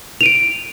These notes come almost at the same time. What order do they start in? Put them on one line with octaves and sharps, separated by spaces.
F7 D#7 D7